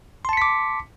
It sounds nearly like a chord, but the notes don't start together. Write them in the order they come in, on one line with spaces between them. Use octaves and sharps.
C6 A5 C#7 B6 D6